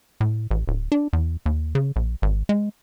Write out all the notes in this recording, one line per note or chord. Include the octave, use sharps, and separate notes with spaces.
A2
A1
D1
D4
E2
D#2
C#3
A#1
G#1
G#3